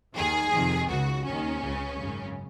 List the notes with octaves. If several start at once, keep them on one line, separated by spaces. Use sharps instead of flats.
D#2 D#3 G#4
F2 C3 D#3
C#2 C#3 F#4
D#2 D#3 C#4
C#2 C#3
G#1 F#2 C#3